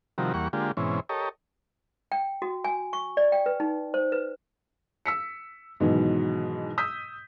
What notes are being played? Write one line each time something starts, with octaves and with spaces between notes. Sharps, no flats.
C3 D#3 F3 G3 F#4 A#4
E2 G3 A#3 F#5 C#6
D3 G#3 A#3 F4 G4
G#2 B2 E3 C4 C#4
G4 A4 A#4 C#5 D#5
G5
F#4
G#5
C#6
D5
G5
B4
D#4
C5
B4
E6 B6 C#7
G#2 B2 D#3 E3 F#3
D#6 E6 G6 B6